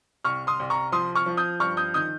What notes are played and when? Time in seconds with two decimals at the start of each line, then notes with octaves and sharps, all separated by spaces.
0.24 C2 C#6 F6
0.47 C6 D#6
0.60 C2
0.70 A#5 C#6
0.92 F3 C6 D#6
1.15 C#6 F6
1.26 F3
1.37 D#6 G6
1.60 G2 C#6 F6
1.77 D#6 G6
1.94 D#3 D#6 G6